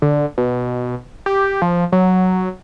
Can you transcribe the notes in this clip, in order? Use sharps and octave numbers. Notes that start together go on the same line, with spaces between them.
D3
B2
G4
F3
F#3